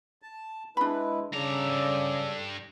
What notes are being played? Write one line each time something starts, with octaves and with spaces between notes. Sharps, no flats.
A5
G#3 D4 E4 B4 B5
G2 C#3 A4 D5 A#5
G2